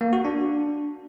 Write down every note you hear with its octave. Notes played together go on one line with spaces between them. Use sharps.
A#3
F#4
D4